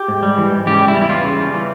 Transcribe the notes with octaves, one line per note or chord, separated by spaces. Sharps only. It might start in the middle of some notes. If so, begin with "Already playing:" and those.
Already playing: G4
G#2
G3
E3
G#2
C#3 G4
G3
E4
E2
E4
E3 F4
C#3
G3
E3